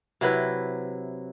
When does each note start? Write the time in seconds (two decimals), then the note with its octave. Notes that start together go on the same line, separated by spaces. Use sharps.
0.21 C3 F#3 E4 B4